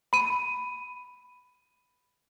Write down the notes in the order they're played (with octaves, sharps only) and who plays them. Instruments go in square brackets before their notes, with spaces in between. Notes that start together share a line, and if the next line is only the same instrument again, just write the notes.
[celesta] B5 D#7